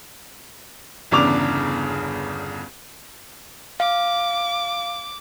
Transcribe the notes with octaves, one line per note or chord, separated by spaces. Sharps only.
G1 E2 C#3 D4 D6 F7
F5 D6